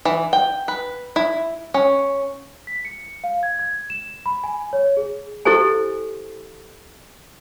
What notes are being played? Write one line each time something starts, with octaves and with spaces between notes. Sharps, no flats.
E3
G5
B4
E4
C#4
B6
C#7
F5
G#6
G#6
E7
B5
G#5
C#5
G#4
E4 G4 A4 C5 G#5